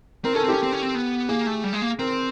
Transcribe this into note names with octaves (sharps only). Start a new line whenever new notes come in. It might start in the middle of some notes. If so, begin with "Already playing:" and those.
C4 A#4
C#4 A4
C4
C#4 G4
C4
C#4
C4
B3
A#3 G#4
A3
G3
G#3
A#3
C4 A#4